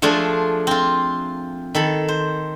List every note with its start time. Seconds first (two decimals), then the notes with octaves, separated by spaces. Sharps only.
0.02 F3 A3 D4 F4 G#4
0.67 C4 F4
1.75 D#3 A4 B5
2.08 C5